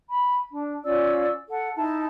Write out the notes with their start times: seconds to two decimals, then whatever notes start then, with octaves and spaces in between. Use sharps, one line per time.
0.10 B5
0.51 D4
0.84 C#4 F4 D5 E6
1.49 A4 F#5
1.76 D#4 E4 A5